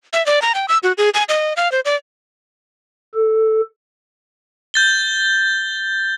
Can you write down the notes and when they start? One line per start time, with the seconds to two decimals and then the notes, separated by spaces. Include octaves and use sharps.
0.13 E5
0.26 D5
0.42 A#5
0.55 G5
0.68 E6
0.83 F#4
0.98 G#4
1.14 G#5
1.29 D#5
1.57 F5
1.72 C5
1.85 D5
3.14 A4
4.74 G6 A6 G7